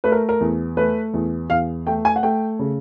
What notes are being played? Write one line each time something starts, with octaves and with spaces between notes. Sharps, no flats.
A3 B4
A#4
A#4
E2
A3 B4
E2
E2 F5
A3 G5
G#5
F#5
A3 G5
C#3